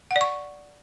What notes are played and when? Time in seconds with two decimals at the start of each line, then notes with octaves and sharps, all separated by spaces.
0.11 F#5
0.16 D5
0.21 C#6